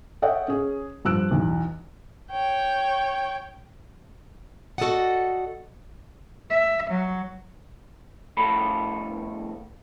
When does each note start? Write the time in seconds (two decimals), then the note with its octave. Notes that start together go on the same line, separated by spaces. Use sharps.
0.22 A4 C#5 D#5 E5 F#5 G5
0.48 C#4 G#4
1.05 G2 F3 E6 F#6 D7
1.31 B1 E2
2.31 C#5 G5
4.78 F#4 A4 C5 D5 D#5 F#5
6.50 E5
6.90 F#3
8.37 F2 A2 A4 B5